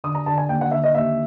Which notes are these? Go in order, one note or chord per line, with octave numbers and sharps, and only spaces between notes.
D3 D#6
A#5
D3 A5
G#5
D#2 G5
F#5
D3 E5
D#5
D#2 E5